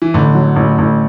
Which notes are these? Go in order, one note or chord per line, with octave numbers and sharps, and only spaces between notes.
E3
A1 D3
F#3
A1
A1